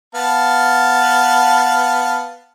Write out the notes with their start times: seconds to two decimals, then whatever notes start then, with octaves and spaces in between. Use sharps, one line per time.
0.15 B3 F5 A5